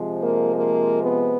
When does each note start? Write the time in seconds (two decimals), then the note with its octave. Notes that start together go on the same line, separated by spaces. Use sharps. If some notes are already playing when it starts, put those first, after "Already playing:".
Already playing: C3 F3 G#3
0.23 A#3
0.55 A#3
1.02 B3